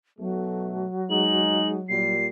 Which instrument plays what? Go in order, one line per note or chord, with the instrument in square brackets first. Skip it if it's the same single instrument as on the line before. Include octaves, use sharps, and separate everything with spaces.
[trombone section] B1 B2 A3 [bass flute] F#3
[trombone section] G#3 D#4 [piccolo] F#7
[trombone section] A#2 G3 [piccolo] C7